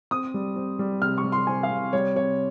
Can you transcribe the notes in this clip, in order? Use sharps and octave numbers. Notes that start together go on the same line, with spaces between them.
C4 D#6
G3
C4
G3
C3 F6
C#6
G3
C6
C4 G#5
F5
C3
G3 C#5
C3 C#5